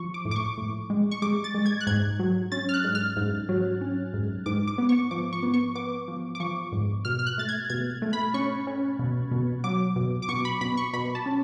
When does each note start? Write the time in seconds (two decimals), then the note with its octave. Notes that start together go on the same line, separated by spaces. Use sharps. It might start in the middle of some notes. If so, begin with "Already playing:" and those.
Already playing: F3 C#6
0.14 D6
0.25 A2
0.31 D6
0.36 C#6
0.58 A2
0.90 G#3
1.11 C#6
1.22 G#3 D6
1.44 A6
1.54 G#3
1.66 G#6
1.81 F#6
1.87 G#2 G#6
2.19 F#3
2.52 C#4 A6
2.69 F6
2.74 F#6
2.84 G#2
2.95 F6
3.16 G#2
3.49 F#3
3.81 C#4
4.14 G#2
4.46 G#2 D6
4.67 D6
4.78 B3
4.89 C#6
5.11 F3 D6
5.33 C#6
5.43 B3
5.54 C#6
5.75 B3 D6
6.08 F3
6.35 D6
6.40 F3 C#6
6.72 G#2
7.05 B2 F6
7.19 F6
7.27 F#6
7.38 A3 A6
7.49 G#6
7.70 B2 G#6
8.02 A3
8.13 B5
8.34 C#4 C#6
8.67 C#4
8.99 B2
9.31 B2
9.64 F#3 D6
9.96 B2
10.22 D6
10.29 B2 C#6
10.45 B5
10.61 B2 B5
10.77 C#6
10.93 B2 B5
11.15 A5
11.26 C#4